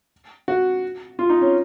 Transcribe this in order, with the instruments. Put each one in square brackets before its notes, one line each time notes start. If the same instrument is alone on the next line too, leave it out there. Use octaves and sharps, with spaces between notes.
[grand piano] F#4
F4
D#4
C#4